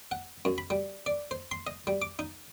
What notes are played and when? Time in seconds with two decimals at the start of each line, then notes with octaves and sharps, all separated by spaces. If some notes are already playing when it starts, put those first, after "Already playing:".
0.11 F#5
0.45 F#2
0.58 B5
0.70 G3
1.06 D5
1.31 C5
1.51 C6
1.67 D#5
1.87 G3
2.02 D6
2.19 D#4